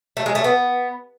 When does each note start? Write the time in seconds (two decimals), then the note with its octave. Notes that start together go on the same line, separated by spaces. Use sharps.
0.17 A3
0.26 G#3
0.35 A3
0.44 B3